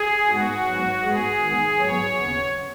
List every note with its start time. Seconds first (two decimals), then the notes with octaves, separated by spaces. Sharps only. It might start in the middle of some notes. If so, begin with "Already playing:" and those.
Already playing: G#4
0.26 G#2 G#3 B3 F#4
0.64 G#2 F#3 B3
1.02 G#2 G#3 B3 G#4
1.39 G#2 D#3 B3
1.77 G#2 F#3 B3 C#5
2.15 D#2 C#3 B3